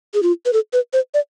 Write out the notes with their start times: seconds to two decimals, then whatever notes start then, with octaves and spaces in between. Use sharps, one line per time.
0.14 G#4
0.23 F4
0.46 B4
0.53 A4
0.73 B4
0.93 C5
1.14 D5